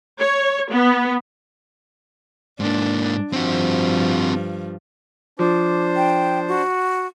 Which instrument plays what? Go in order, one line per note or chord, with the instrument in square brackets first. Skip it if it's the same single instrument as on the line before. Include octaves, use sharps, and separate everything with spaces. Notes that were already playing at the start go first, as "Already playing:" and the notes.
[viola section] C#5
B3
[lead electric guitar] G#2 A#3 [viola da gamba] D4
[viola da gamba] G2 F3 [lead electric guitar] C4 F#4
[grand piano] F3 [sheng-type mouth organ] D4 C5 [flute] D6
[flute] G5
F#4